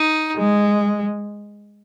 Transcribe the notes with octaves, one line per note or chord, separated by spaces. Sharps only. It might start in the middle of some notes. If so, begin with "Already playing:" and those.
Already playing: D#4
G#3